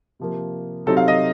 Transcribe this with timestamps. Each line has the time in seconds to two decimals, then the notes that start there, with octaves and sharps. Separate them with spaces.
0.19 C3 F3 A#3
0.86 C3 F#3 C4 D#4 A4
0.97 F5
1.08 D#5